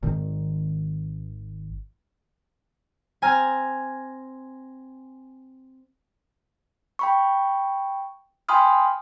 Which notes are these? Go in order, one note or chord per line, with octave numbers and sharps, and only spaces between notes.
G#1 D#3
C4 G#5 A#5 F6
G5 B5 C#6
G5 G#5 B5 C6 D#6 F6